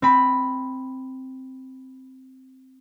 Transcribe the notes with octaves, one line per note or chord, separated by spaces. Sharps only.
C4 B5